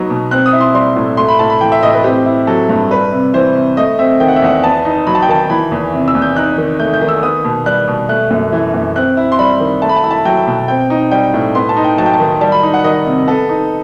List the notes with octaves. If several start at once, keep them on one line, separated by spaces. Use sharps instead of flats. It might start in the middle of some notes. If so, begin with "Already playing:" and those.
Already playing: F#3 B3 D#4
B2
C4 F#6
D#6
E4
C6
G3 C6
A2
A3 C6
B5
A2 A5
B5
E3 G5
E5
A2 D#5
B4
C4 G4
E4
F#3 A4
G2
G3 B4
C3
E3 C5
C3
A3 D#5
C4 E5
D#3 G5
F#5
E5
E2 F#5
B3 A5
D#4
F#3 B5
A5
G5
D#3 A5
E3 B5
E2
C3
E6
E2
G6
D#4 F#6
D#3
A3 G6
G6
D#3
E6
B3 D#6
B2
G3 F#6
B2
A3 F#6
F#2
E3
F#2
C4 F#6
E4
C6
G3 B5
D#3
A3 A5
B5
A5
E4 B5
A5
F#3 G5
B2
C4 G5
D#4
G3 G5
A2
B3 C6
A5
D#4
G5
F#3 A5
G5
A5
D#3
G3 A5
B5
D#4
F#5
D#3 D#5
C3
B3 A4
D#4